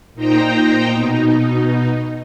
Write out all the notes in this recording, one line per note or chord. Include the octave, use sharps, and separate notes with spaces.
A#2 D#4 C5 G5 A#5
B2 D#4